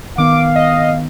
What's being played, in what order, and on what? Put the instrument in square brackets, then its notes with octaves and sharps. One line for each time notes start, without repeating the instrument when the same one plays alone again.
[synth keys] D#3 B3 [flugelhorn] F5 [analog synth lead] D6
[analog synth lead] D#5